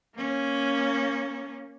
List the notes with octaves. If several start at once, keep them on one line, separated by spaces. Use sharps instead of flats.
A#3 C#4